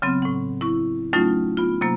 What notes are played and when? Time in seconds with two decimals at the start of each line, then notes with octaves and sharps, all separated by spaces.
0.02 C#3 F#3 B3 C4
0.22 A2 F#5
0.61 E4 C#6
1.13 F#3 G3 A3 C#4 D#4 F4
1.57 B3 F4
1.81 C3 F#3 A#3